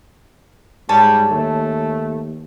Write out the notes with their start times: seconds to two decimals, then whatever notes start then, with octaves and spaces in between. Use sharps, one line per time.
0.89 G#2 G3 C#5 G#5 A5
1.30 D#2 A3